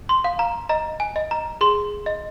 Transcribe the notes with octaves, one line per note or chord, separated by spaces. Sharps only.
C6
F5
A#5
D#5 A#5
G#5
D#5
A#5
G#4 C6
D#5